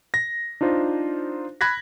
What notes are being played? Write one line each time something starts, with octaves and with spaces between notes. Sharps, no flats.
A#6
D4 D#4 F4 C5
B5 F#6 G#6 A#6 B6